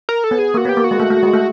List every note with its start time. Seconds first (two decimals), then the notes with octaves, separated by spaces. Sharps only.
0.09 A#4
0.24 A4
0.31 B3
0.39 G#4
0.54 A#3 F#4
0.65 B3 G4
0.77 A#3
0.84 F#4
0.91 G#3
1.00 A3
1.11 A3
1.23 G#3
1.34 A3